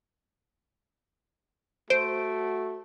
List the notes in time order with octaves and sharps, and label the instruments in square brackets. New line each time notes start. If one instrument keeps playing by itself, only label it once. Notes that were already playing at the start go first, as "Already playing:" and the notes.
[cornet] A3 [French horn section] F#4 [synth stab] C5 [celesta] D7